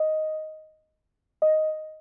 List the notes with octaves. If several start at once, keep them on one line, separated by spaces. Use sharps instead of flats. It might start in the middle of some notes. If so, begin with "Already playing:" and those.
Already playing: D#5
D#5